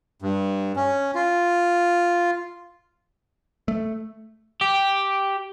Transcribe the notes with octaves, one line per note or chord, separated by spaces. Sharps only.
G2
C#4
F4
A3
G4